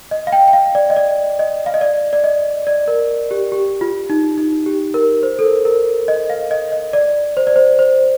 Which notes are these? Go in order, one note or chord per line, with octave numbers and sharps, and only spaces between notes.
D#5
F5
G5
G5
F5
D5
D#5
D5
D#5
F5
D#5
D5
D5
D#5
D5
A#4
G4
G4
F4
D#4
D#4
G4
A#4
C5
A4
A#4
A#4
D#5
F5
D#5
D#5
D5
C5
D5
C5
C5